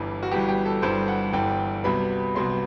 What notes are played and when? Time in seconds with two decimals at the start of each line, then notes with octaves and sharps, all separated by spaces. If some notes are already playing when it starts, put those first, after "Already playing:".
Already playing: G1 G2 E3
0.23 F#4
0.31 G1 G2 E3 G4
0.49 G4
0.65 A4
0.82 G1 G2 E3 C5
1.08 F#5
1.33 G1 G2 E3 G5
1.84 C2 C3 F#3 B3 B5
2.35 C2 C3 F#3 B3 C6